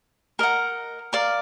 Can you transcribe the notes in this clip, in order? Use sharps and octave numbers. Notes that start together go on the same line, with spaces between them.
A#4 D#5 F#5
A#4 D5 F5